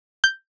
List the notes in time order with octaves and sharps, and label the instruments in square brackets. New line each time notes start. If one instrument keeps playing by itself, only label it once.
[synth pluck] G6